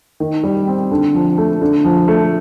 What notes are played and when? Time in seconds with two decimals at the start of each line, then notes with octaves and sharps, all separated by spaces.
0.20 D#3
0.44 G3
0.68 C4
0.91 D3
1.15 F3
1.38 A3
1.62 D3
1.85 F3
2.08 A3